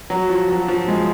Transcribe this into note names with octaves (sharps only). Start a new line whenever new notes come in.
F#3
F3
F#3
F3
G#3